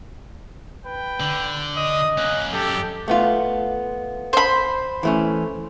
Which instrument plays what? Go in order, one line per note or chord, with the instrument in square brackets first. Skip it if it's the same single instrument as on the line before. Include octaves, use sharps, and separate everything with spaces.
[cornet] B4 [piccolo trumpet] G5
[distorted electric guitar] D3
[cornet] D#5 [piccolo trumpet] D#6
[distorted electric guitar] A#3 C#4 [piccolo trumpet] F#6
[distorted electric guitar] F#2 [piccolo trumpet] G4 [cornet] A4
[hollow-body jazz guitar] A3 B3 F4
[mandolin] C5 B5
[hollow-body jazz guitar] E3 A3 C#4